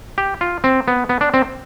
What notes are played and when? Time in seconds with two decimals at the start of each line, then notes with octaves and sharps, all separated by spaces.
0.18 G4
0.41 F4
0.64 C4
0.88 B3
1.09 B3
1.21 D4
1.34 C4